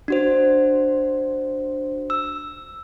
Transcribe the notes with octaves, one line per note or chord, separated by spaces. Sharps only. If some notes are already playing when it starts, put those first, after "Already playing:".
D4 F#4 C5
E6